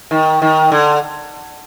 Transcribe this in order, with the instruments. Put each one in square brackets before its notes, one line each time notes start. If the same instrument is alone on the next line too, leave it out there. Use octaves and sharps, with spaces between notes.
[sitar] D#3
D#3
D3